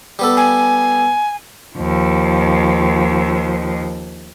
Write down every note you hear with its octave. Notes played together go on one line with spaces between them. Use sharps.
G3 B3 A4
G#5
D#2 F3